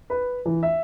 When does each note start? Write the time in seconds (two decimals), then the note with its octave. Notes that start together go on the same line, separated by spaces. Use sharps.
0.10 B4
0.46 E3
0.63 E5